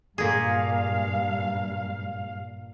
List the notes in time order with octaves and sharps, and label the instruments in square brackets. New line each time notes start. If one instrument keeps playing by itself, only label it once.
[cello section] G2 F5 [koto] A#2 G#4